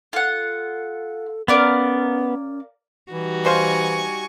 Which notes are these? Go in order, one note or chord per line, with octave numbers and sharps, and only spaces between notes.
F4 A4 F#5
B3 C#4 A#4 D5 F5
E3 G3 D#4 F#4
B2 C5 F5 G#5 C#6